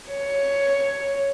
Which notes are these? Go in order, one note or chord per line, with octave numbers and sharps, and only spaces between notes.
C#5